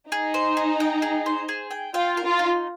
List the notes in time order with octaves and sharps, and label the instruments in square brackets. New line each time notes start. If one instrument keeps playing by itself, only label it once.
[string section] D#4 [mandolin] G#4
[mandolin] C5
G#4
G5
G#4
C5
G#4
G5
[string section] F4 [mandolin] G5
[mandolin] A#4
[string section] F4
[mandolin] D#4